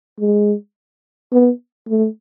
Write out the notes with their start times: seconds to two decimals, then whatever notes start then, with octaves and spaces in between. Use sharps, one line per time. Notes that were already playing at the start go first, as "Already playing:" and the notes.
0.20 G#3
1.33 B3
1.89 A3